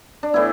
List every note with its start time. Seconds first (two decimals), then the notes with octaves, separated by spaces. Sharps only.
0.23 D4
0.34 A2 E3 B3 E4